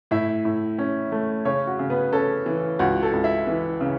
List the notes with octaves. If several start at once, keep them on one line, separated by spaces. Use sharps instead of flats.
A2 E4 E5
A2
C#4
A3
C#3 C#4 C#5
F#4
C#3
B3 B4
C#4 A4
E3
C#2 F#4
A4
C#2
E4 E5
E3
C#3